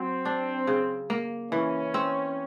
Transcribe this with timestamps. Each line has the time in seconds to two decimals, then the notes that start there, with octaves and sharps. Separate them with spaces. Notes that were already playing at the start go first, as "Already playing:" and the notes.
Already playing: F#3 C4
0.25 D4
0.67 C#3
1.10 A#3
1.52 E3 C#4
1.94 C4